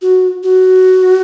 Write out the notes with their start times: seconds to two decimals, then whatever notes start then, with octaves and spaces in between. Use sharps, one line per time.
0.02 F#4
0.44 F#4